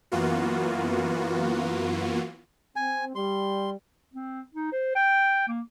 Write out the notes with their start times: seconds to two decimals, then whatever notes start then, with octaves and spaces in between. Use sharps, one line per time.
0.12 F#2 E3 A#3 B3 F4 F#4
2.76 C4 G#5
3.15 G3 C6
4.14 C4
4.54 D#4
4.72 C5
4.95 G5
5.48 A#3